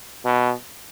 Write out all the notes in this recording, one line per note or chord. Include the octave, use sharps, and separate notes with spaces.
B2